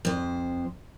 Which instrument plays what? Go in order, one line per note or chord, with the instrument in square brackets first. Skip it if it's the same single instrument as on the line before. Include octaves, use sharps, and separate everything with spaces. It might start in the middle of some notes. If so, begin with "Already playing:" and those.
[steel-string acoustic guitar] F2 C5